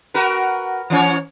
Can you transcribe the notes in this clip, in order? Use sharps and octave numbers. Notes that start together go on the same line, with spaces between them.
F#4 A#4 B4
E3 C#4 C#5